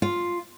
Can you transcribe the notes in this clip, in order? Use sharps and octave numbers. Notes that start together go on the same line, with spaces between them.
F4